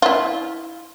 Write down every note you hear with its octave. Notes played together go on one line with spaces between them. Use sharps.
E4 F4